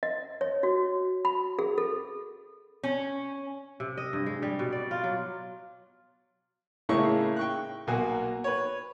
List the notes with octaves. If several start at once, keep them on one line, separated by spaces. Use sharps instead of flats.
D#5
C#5
F#4
B5
G#4
A4
C#4
C3
D#5
G2
G#3
G3
B2
D5
F4
F#3
A2 C#3 G#3 A#3 E4 C#6
G5 C#6 F#6
B1 B2 A#3 F#4 G#5
B4 C#5